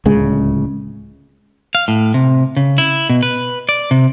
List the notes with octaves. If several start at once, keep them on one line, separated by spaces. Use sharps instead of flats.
D1 C#2 C#3 G#3
F5
A2
C3
C#3
E4
B2
B4
D5
C3